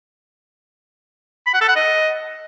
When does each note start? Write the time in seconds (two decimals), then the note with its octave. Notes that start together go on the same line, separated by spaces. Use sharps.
1.46 B5
1.54 F#5
1.61 A4
1.69 F#5
1.76 D#5